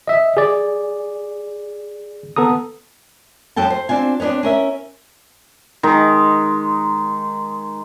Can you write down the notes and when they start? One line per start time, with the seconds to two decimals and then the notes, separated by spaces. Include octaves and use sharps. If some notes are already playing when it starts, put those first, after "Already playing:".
0.08 D#5 E5
0.37 G#4 D5
2.36 B3 A4 A#5 D#6
3.56 F#2 F#4 A4 G5 A5
3.70 C5
3.89 C4 D4 F4 G#5
4.20 C4 D4 D#4 B4 C#5
4.43 C#4 A#4 E5
5.83 D#3 G#3